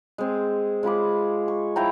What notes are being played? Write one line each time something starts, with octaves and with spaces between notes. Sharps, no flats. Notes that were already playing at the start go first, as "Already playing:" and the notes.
G#3 C4
G#3 F4 B5 D6
C#6
F3 E4 G5 A#5